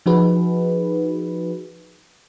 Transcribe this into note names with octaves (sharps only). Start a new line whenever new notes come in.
F3 D#4 F#4 G#4 B4